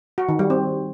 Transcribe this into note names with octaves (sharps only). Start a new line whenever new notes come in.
F#4
D#3
G3
C4